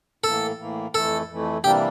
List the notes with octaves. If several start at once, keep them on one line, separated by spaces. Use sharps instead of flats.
A2 E3 A#3 A4
A2 E3 A#3
F2 E3 A3 A4
F2 E3 A3
C3 E3 G3 A#3 D4 G4